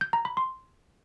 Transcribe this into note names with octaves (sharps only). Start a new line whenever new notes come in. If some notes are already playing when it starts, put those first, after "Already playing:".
G6
A#5
B5
C6